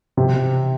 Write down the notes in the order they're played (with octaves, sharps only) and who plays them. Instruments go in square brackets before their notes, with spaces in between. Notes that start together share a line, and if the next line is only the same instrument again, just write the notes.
[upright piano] C3